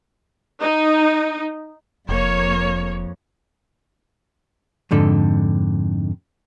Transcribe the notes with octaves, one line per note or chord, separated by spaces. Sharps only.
D#4
F1 F2 A#3 C#5
F2 G#2 D3 A4